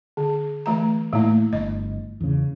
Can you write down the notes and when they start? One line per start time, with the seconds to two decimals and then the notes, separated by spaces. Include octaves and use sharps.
0.17 D3
0.66 E3 A3 A#5
1.13 A2 A3 A#3 E4
1.53 G1 D#5
2.21 E2 C#3